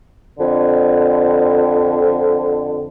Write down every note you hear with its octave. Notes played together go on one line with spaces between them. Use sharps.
F2 D3